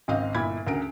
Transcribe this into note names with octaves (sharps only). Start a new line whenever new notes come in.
G#1 C#2 C4 D#5 F5
G1 A#2 E4 B5 G#6
D2 C#3 A#4 D7